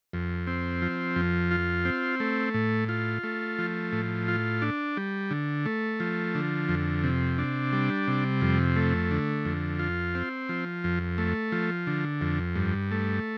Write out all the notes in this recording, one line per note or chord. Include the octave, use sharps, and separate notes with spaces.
F2
C4
F3
F2
F4
C4
A3
A2
F4
A3
F3
A2
F4
D4
G3
D3
A3
F3
D3
F2
C3
D4
G3
C3
F2
A3
D3
F2
F4
C4
F3
F2
A3
F3
D3
F2
G2
A3